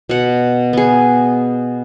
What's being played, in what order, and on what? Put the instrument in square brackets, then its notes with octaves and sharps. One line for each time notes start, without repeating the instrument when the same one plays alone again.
[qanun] B2 F#5
B3 G#4